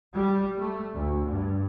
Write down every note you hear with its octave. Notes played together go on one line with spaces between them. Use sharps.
G3
A3
D2
G2